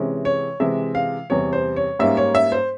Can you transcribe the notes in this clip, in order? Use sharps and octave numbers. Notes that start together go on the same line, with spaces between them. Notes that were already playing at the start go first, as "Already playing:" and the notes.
Already playing: C3 E3 G#3 C#4
C#5
C3 E3 G#3 E5
F5
E2 C3 G3 C#5
C5
C#5
G#2 G3 A#3 C#4 E5
C#5
E5
C5